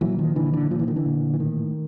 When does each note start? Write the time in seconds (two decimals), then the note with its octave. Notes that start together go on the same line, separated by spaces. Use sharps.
0.01 A#2 E3 F#3
0.19 D#3 F3
0.36 A#2 D3 E3
0.53 D3 E3
0.70 A#2 F3
0.79 E3
0.88 D#3
0.96 D3 E3
1.05 A#2
1.34 E3
1.40 A2 D#3